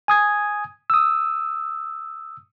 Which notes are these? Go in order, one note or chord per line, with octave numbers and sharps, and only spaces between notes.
G#5 D#6 G#6
D#6 E6